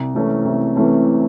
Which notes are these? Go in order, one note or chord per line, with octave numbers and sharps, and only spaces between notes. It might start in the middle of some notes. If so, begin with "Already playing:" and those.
Already playing: C2
C3 E3 A3 C#4
C2
C3 E3 A3 C#4